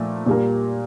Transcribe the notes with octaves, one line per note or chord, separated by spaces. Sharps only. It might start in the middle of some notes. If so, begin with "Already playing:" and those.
Already playing: A#2 F3 A3
A#2 G3 A#3